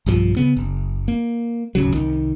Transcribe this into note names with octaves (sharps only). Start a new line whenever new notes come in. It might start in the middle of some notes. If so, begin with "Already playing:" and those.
B1 G2 F3
C#3 B3
F#1
A#3
D1 G#1 C#3 F#3
C2 D#3